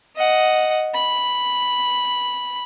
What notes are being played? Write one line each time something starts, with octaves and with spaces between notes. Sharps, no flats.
D#5 F#5
B5